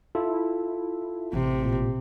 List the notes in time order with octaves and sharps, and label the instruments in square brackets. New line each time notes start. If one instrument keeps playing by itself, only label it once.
[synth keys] E4 [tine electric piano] F4 A4
[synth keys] A1 [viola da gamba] C3
[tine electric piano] A#2 G4